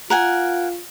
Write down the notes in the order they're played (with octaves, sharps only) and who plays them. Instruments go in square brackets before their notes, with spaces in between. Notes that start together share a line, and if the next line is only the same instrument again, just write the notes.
[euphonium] F4 [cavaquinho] A#4 F#5 G#5